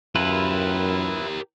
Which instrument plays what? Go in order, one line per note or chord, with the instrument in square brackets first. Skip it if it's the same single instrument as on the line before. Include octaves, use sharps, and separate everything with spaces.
[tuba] F#2 [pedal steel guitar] E4 F4 B4 [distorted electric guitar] G4 A#4